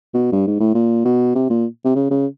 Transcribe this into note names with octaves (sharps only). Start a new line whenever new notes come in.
B2
G2
G#2
A2
A#2
B2
C3
A#2
C3
C#3
C#3